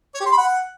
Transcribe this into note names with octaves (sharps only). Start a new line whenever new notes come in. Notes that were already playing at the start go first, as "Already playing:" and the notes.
C#5
G4
C6
B5
F#5